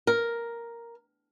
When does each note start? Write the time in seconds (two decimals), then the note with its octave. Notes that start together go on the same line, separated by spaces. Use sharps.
0.07 A#4